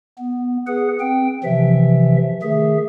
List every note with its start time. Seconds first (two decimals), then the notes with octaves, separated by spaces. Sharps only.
0.18 B3
0.67 G#4 B4 F#5
1.00 C4 G5
1.44 C3 E3 F3 E5
2.43 D#3 A3 G#4 E5